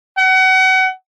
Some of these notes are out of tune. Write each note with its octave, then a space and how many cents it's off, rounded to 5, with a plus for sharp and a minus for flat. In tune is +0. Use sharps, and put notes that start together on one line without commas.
F#5 +30